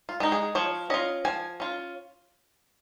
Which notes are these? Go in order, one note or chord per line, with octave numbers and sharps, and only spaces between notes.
F4
G#3 D#4
G#4
F3 C#5
C#4 F4 D#5
F3 G#5
C#4 F4